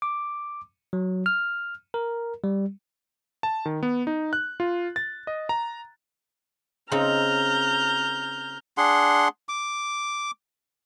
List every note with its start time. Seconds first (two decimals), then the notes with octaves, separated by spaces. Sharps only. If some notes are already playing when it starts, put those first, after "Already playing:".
0.02 D6
0.93 F#3
1.26 F6
1.94 A#4
2.44 G3
3.43 A5
3.65 D#3
3.83 B3
4.07 D#4
4.33 F#6
4.60 F4
4.96 A6
5.27 D#5
5.49 A#5
6.92 C#3 C4 D#4 A#5 F6 G6
8.78 D4 G#4 F#5 C6
9.49 D6